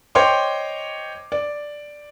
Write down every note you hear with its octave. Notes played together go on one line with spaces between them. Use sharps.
C5 C#5 D#5 G5 C6 D6
D5